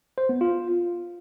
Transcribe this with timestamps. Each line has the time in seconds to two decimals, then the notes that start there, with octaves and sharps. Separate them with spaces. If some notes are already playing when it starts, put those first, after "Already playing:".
0.18 C5
0.29 B3
0.41 F4